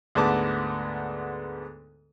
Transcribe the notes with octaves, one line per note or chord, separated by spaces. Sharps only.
D2 G#2 B3 A5 D6